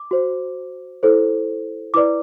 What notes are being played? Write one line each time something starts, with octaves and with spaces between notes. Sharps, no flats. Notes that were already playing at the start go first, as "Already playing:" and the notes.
Already playing: D6
F#4 C5
E4 A4 C5
E4 B4 D5 D6